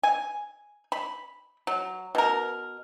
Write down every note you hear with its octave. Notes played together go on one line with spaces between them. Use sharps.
G#5
B5
F#3
B2 A#4